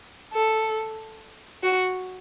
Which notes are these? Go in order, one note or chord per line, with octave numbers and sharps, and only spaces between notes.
A4
F#4